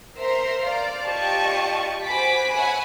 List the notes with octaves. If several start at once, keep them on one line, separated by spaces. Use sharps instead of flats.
A#4 C5 E5 A#5 C6
C5 D5 F5
F4 G4 D5 D#5 A5 C#6
F#4 C5 G#5 B5 D6 B6
C#5 E5 F#5 G#5 B5